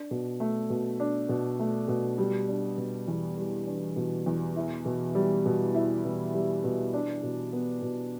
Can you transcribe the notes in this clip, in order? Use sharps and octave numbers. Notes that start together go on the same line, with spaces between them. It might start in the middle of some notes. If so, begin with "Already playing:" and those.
Already playing: D4
B2
A3
B2
D4
B2
A3
B2
G3
D4
B2
E2
G3
D4
B2
E2
E4
B2
G3
B2
E4
B2
G3
B2
D4
B2
B3
B2